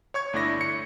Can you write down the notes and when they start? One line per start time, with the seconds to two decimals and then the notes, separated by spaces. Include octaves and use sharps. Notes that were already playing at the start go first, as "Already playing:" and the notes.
0.14 C#5 C#6 G#6
0.33 G1 A3 D4 E4 C#6 A#6
0.61 C#7